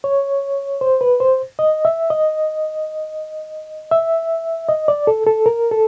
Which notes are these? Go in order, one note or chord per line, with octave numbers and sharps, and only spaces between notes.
C#5
C5
B4
C5
D#5
E5
D#5
E5
D#5
D5
A4
A4
A#4
A4